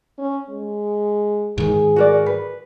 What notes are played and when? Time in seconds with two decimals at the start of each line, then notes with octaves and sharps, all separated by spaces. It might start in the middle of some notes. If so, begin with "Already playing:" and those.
0.19 C#4
0.50 G#3
1.58 G#2 D#3 G#4
1.96 F#4 A#4 D5
2.26 B4